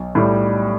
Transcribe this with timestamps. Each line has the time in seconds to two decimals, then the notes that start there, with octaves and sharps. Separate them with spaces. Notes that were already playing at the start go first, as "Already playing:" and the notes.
Already playing: B1
0.15 A2 G3